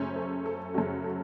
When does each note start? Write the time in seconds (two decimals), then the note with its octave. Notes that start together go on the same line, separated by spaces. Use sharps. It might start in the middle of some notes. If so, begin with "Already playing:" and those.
Already playing: F#2 C#3 A3 C#4 C5
0.16 A4
0.46 A4
0.74 F#2 C#3 A3 C#4 F#4
1.04 A4